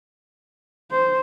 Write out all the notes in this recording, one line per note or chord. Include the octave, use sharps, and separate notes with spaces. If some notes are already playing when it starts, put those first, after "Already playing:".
C5